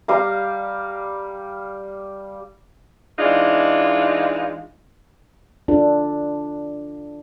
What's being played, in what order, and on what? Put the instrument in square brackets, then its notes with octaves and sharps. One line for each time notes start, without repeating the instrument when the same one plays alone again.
[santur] G3 F5 A#5
[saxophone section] E3 G#3 D4 D#4 F4
[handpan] D4 F4 A4